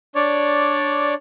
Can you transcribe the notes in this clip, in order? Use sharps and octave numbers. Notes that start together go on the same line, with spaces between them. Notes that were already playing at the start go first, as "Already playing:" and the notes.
D4 C#5 D5